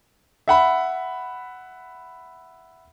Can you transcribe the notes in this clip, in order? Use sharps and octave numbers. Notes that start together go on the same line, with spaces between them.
E5 F#5 B5